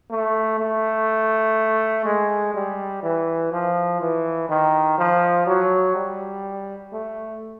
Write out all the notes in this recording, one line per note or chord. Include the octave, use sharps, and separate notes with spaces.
A3
A3
G#3
G3
E3
F3
E3
D#3
F3
F#3
G3
A3